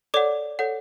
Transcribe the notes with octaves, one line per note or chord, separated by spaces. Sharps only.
A4 C#5 D5 F#5 D6
A4 C#5 F#5